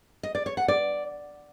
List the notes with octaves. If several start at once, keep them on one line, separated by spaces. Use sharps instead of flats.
D#5
D5
C#5
F#5
D5